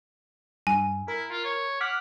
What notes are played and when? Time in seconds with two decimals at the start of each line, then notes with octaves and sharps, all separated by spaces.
0.67 G2 G#5
1.08 E4 A#4
1.30 F4
1.45 C#5
1.81 F#5 D6 F6 B6